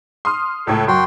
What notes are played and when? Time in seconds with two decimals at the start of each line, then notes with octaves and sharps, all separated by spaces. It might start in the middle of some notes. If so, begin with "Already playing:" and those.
0.25 C6 D#6 F6
0.67 C#2 A2 A4
0.88 F#2 F#4 G5 C6